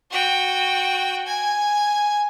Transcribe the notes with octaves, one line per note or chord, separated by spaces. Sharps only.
F#4 G5
G#5